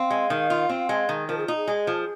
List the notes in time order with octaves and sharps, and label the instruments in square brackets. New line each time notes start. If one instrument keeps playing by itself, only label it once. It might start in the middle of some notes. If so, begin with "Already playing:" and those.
Already playing: [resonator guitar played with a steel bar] C4 [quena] F5
[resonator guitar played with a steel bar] G#3
D#3
F4
C4
G#3
D#3
[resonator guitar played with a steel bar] F3 [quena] A#4
[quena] G#4
[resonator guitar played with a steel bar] D#4 [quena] F4
[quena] G#4
[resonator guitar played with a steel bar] G#3
F3